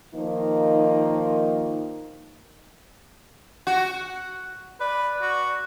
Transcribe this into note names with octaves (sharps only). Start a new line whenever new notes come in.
D#3 F3 A#3 D#4
F#4
B4 D5
F#4